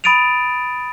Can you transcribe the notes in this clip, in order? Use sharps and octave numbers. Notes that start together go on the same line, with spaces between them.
B5 D#6 A6 D7 D#7 F7